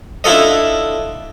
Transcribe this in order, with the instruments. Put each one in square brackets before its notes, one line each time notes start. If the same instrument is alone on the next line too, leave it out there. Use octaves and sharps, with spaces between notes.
[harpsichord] D4 E4 F4 A4 D#5